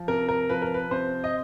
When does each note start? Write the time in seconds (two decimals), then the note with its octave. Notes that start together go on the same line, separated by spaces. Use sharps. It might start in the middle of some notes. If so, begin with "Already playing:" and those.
Already playing: F3
0.08 C3 A#4
0.29 A#4
0.50 F3 B4
0.62 A#4
0.74 B4
0.91 C3 C5
1.24 D#5